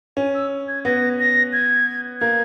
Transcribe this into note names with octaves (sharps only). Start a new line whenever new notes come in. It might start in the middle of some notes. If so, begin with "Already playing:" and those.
C#4 G#5
E6
G#6
B3 A#6
A#6
G#6
A#3 G#6